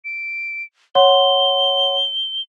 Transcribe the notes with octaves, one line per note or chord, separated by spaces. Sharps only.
D7
C#5 F#5 C6 G7